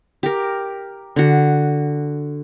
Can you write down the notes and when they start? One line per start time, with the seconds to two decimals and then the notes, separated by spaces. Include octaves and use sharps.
0.23 G4 A#4
1.16 D3 F#4